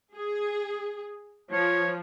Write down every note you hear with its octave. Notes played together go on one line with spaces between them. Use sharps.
G#4
F3 C#5